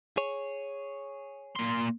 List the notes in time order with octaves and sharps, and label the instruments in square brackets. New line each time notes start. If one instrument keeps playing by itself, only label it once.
[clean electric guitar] G#4 C#5
[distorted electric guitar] A#2 C6